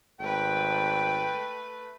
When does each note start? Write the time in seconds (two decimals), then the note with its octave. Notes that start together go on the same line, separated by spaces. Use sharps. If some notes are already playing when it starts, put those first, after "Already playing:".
0.20 G#1 A3 B4 G5